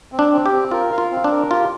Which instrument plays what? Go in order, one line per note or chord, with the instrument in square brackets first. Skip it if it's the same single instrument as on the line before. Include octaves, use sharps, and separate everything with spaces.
[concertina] C4
[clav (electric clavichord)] D4
[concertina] C4
[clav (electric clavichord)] G4
[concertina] C4
[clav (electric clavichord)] F4 [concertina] A#4
[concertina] F5
[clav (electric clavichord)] F4
[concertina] C4
[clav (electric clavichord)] D4
[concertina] A#4
[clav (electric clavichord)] F4 [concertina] G4